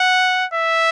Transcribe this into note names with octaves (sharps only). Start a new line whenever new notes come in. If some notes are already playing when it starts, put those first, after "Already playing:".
Already playing: F#5
E5